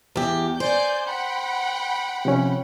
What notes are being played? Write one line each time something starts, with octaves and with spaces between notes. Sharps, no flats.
E2 G4
C5 D5 G#5 G6
F#5 G5 B5
C3 F3 C#4